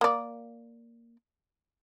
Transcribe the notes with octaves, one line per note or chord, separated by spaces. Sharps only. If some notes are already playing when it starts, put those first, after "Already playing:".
A#3 D5